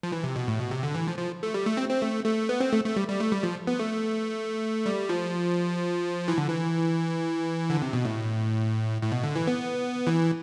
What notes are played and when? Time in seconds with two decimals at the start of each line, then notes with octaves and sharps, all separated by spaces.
0.03 F3
0.12 E3
0.24 C3
0.36 B2
0.48 A2
0.60 B2
0.71 C3
0.83 D3
0.95 E3
1.07 F3
1.18 F3
1.43 A3
1.54 G3
1.66 A3
1.77 C4
1.89 C4
2.02 A3
2.25 A3
2.49 B3
2.60 C4
2.73 A3
2.85 A3
2.96 G3
3.08 G3
3.20 A3
3.32 G3
3.43 F3
3.67 B3
3.79 A3
4.86 G3
5.09 F3
6.28 E3
6.38 D3
6.48 E3
7.70 D3
7.82 C3
7.93 B2
8.05 A2
9.02 A2
9.12 B2
9.24 D3
9.36 E3
9.47 B3
10.07 E3